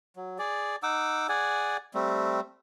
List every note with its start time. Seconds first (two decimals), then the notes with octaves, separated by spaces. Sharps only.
0.16 F#3
0.39 G#4 D5
0.83 D#4 F#5 D6 E6
1.29 G#4 D5 F#5 G#5
1.94 G3 A3 C4